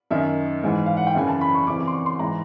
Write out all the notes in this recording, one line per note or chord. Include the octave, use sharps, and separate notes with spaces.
F#2 D#3 E5
G#2 E3
F5
F#5
G5
F#2 C#3 E3 G#5
A5
B5
C#6
F2 C#3 E3 D6
D6
C6
C#6
C6
G#2 E3 A#5